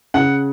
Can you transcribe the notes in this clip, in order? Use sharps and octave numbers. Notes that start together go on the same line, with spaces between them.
C#3 F#5